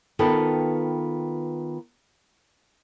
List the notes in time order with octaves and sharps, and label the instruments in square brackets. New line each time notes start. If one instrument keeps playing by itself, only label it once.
[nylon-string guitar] D#3 B3 F4 A4 B4 G5